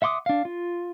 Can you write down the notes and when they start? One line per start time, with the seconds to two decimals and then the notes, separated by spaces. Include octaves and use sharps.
0.02 E5 F#5 C6 D6 D#6
0.26 D4 F5
0.45 F4